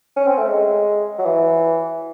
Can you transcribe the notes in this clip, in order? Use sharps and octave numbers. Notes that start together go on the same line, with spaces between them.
C#4
C4
A3
G#3
F#3
E3